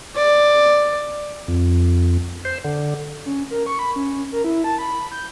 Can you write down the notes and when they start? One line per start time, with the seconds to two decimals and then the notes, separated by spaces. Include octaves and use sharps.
0.16 D5
1.48 F2
2.45 C5
2.64 D3
3.25 C#4
3.51 A#4
3.67 C#6
3.79 B5
3.96 C#4
4.32 A#4
4.44 E4
4.64 A5
4.78 B5
5.12 G6